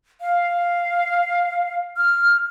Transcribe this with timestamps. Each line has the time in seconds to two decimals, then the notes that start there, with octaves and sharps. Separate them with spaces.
0.21 F5
1.96 F6